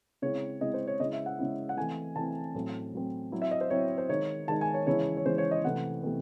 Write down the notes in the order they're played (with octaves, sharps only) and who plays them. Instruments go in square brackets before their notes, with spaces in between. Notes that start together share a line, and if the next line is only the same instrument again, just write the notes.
[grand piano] C#3 G#3 C4 E4 C#5
C#3 G#3 C4 E4 D#5
C5
C#5
C#3 G#3 C#4 E4 D#5
E5
F#5
C#3 G#3 C#4 E4
F#5
E3 A3 C4 E4 G#5
E3 A3 C4 E4 A5
A2 F#3 C4
A2 F#3 C4
F#3 C4 E4
E5
D#5
C5
F#3 C4 E4 C#5
C5
D#3 G#3 D#4 C#5
D#3 G#3 D#4 A5
G#5
C#5
C#3 E3 G#3 C#4 E4 C#5
C#5
C#3 E3 G#3 C#4 E4 C5
C#5
D#5
C3 E3 A3 C4 F#5
C3 E3 A3 C4